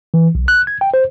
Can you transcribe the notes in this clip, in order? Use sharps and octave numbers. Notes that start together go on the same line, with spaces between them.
E3
B1
F#6
G#6
G5
C5